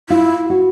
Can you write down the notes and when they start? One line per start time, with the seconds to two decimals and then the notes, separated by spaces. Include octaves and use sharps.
0.10 E4 F4
0.50 F#4